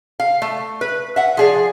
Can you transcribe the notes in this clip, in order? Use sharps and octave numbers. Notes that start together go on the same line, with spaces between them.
F5
A3
B4
E5 F#5
F3 G#4 D5